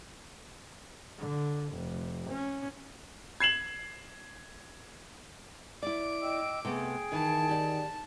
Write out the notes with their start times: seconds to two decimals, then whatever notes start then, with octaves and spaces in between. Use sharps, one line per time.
1.19 D3
1.74 F1
2.31 C#4
3.40 G#6 C7 E7 F#7
5.83 E4 D5 D6
6.21 D#5 G5 E6
6.65 C3 A3 B3 G#4 G5
7.12 D#3 E3 A5
7.49 G4 D5